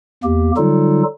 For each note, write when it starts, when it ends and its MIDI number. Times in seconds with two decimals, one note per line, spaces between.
0.24 0.51 40
0.24 0.51 58
0.24 0.51 67
0.57 1.03 50
0.57 1.03 54
0.57 1.03 55
0.57 1.03 63
0.57 1.03 65
0.57 1.03 69